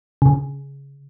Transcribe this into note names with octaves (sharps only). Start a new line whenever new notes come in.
C#3